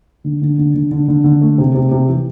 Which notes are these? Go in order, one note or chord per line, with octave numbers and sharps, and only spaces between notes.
D3
D3
D3
D3
D3
D3
D3
A3
C3
C3
C3
E3